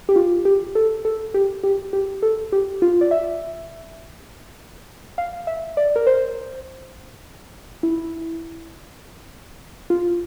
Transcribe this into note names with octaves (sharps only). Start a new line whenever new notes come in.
G4
F4
G4
A4
A4
G4
G4
G4
A4
G4
F4
D5
E5
F5
E5
D5
A#4
C5
E4
F4